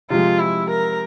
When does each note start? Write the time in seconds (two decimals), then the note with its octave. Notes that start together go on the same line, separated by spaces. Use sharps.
0.10 C3 F3 G#3 F4
0.39 E4
0.70 A#4